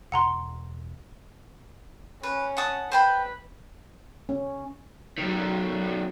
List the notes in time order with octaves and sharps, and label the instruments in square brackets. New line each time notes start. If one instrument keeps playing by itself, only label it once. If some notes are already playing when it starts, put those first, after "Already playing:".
[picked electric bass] E1 [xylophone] F#5 A#5 C6
[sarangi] C#4 [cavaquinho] B4
[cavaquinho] F#5 A5 D#6
[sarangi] B4 [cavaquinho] C5 G5 B5
[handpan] C#4
[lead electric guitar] F#2 D#3